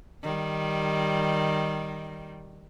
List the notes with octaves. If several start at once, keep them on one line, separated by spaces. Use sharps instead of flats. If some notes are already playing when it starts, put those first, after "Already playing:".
D#3 G3